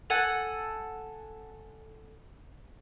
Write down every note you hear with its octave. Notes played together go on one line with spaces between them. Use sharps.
A4 F#5 G#5